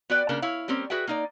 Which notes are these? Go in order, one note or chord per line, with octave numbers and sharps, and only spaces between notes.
B3 F#4 B4 D5 G5
C#3 A#3 D4 A#4
E4 C#5 F5
G3 A#3 C4 C#4
F#4 G#4 B4 E5 G5
A#3 D#4 D5